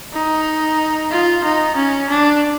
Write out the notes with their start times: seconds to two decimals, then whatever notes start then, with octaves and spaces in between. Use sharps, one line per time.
0.13 D#4
1.11 F4
1.44 D#4
1.76 C#4
2.09 D4